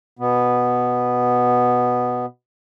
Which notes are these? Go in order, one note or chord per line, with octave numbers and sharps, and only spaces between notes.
B2 B3